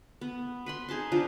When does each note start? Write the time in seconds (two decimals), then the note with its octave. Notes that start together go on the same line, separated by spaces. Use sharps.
0.21 B3
0.66 B4 B5 C6
0.89 D#4 G#4 A5 C6
1.12 F3 D4 F4